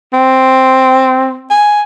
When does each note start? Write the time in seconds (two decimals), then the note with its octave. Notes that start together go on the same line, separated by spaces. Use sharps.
0.13 C4
1.51 G#5